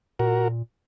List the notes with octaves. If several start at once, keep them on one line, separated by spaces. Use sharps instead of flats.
A#2 F#4 A#4